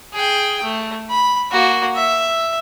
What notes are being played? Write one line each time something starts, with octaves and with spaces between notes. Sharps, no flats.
G#4 G5
A3
B5
A#3 F#4
E5